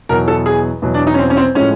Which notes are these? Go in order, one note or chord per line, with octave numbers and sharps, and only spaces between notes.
E2 B2 F#3 A#4
A4
G#4
E2 B2 F#3
D4
D#4
C#4
C4
C#4
C4
A2 F3 G#3 C#4